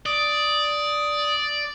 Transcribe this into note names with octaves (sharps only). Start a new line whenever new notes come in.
D5 D#6